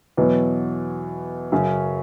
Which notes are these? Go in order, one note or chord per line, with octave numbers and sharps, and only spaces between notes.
E2 B2 F#3
F#2 C#3 F#3 C#4